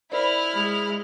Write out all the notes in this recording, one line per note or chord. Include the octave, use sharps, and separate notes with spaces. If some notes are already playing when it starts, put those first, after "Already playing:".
E4 A#4 C5 D5 B5 F6
G#3